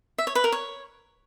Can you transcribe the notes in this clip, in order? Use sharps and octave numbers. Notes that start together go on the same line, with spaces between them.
E5
C#5
B4
A#4
C#5